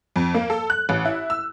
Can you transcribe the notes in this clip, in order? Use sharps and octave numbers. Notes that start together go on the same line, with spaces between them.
F2
A#3
A4
F#6
A1
E4
E6